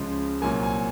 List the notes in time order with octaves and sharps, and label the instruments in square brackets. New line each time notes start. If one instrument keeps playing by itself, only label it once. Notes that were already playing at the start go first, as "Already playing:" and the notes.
Already playing: [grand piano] C#2 C#3 F3 G#3
C2 A#2 F#3 A#3 G#5
G#5